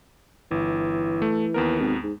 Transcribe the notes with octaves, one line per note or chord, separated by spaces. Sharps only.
G1 E3
A3
D#2 B3 A#4
G#1
G#2